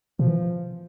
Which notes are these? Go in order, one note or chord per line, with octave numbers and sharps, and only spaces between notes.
B2 F3
E3